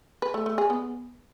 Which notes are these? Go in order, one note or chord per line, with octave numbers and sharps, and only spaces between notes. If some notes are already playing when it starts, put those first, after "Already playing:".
B4
A3
A3
G#4
B3